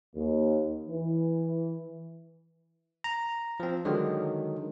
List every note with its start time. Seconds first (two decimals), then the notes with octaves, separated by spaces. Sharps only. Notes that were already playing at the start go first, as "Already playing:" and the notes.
0.16 D#2
0.90 E3
3.04 A#5
3.60 F3 C4
3.85 D3 D#3 F#3 G#3